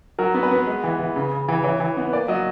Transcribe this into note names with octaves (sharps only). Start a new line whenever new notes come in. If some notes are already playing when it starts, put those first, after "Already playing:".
F#3 A#4
B3
B4
B3
G#3
E3
E3
C#3
C#3
E3
E3 C#5
E3
B3
A#3 D5
F#3 D#5